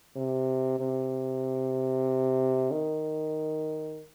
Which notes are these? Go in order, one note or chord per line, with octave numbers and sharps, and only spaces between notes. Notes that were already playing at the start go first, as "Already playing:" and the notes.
C3
C3
D#3